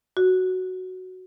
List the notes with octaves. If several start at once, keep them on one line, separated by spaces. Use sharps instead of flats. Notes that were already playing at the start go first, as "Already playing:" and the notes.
F#4